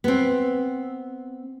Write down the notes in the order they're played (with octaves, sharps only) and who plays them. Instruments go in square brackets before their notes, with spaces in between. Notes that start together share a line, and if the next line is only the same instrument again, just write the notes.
[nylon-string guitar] B3 C4